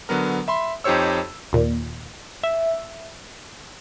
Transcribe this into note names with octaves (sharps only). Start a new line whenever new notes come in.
D3 F#3 B3 A#4
E5 B5 C6
F2 D#4 G4 C5 C#5 E6
D#2 A#2
E5